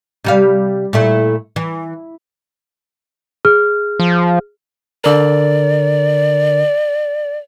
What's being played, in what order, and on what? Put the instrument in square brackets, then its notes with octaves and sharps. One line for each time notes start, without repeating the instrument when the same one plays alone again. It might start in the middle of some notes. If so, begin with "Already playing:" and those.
[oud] C3 G3 F5
A#2 A3 E4
E3
[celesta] G#4 F6
[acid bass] F3
[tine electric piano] D3 A#4 [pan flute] D5